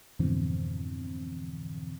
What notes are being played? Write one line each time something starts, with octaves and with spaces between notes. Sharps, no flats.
F2 G#2 B2 D3 E3 C4